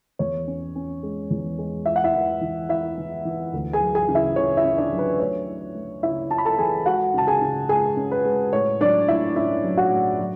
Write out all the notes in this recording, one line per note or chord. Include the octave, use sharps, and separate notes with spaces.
E2 C#5
C#4
C#4
G#3
E2
G#3
E4 E5
F#5
E4 E5
E3
E3
E4 E5
E3
E3
D2
G#4 G#5
F#3
G#4 G#5
C#3
E4 E5
C#3 C#5
E4 E5
C#4
D4 D5
F#3
B4
A3 C#5
E4
A3
C#3 E4 E5
E4 A5
B5
A4 A5
E3 G#4 G#5
G#3 F#4 F#5
C#3 A5
G#4 G#5
C#3
G#3 G#4 G#5
C#4
B4
G#3
A2 C#5
F#3 D4 D5
A2 E4 E5
C#4 E4 E5
F#3
F#4 F#5
A2
F#3